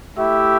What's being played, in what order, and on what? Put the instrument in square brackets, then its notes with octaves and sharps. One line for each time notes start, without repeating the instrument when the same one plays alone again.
[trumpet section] A3 E4 G4 E5